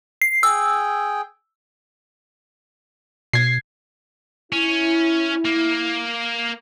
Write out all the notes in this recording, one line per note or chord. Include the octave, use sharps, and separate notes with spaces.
C7
G#4 G5 E6
B2 G#6 C7
C#4 E4
A#3